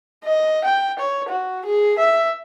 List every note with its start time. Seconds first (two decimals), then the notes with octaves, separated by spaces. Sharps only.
0.25 D#5
0.64 G5
0.99 C#5
1.29 F#4
1.65 G#4
1.98 E5